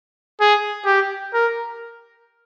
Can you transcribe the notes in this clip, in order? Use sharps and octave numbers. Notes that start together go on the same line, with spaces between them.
G#4
G4
A#4